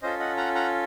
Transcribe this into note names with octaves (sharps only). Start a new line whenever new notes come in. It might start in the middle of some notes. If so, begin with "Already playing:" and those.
C#4 F4 A4 C5 D#5
D#5 F#5
F#5 A#5
F#5 A#5